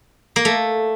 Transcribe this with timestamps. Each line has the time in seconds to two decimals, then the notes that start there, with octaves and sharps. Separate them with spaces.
0.36 A#3
0.45 A3